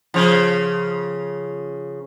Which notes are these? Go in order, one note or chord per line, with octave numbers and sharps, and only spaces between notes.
C#3 F3